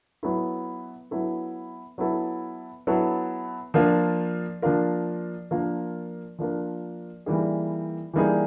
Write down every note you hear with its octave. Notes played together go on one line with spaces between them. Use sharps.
F#3 B3 E4 A4
F#3 B3 E4 A4
F#3 B3 E4 A4
F#3 B3 E4 A4
F3 A#3 D4 F4 A#4
F3 A#3 D4 F4 A#4
F3 A#3 D4 F4 A#4
F3 A#3 D4 F4 A#4
E3 G3 A#3 D#4 G#4
E3 G3 A#3 D#4 G#4